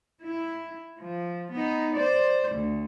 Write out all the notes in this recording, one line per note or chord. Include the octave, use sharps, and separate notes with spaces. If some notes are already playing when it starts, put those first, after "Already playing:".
E4
F3
B3 D#4
C5 D5
D2